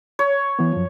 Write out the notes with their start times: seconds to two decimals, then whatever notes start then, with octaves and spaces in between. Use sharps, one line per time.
0.19 C#5
0.59 E3 B3
0.73 F#2 F3